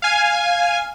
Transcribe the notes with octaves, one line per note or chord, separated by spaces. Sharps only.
F5 G#5